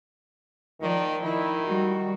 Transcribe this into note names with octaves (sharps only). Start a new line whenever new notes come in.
D#3 F3 D5
D#3 E4
G3 F#4